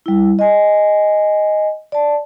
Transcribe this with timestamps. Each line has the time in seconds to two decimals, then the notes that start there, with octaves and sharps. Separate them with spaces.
0.06 G3 E4
0.39 D#5 G#5
1.92 D5 A5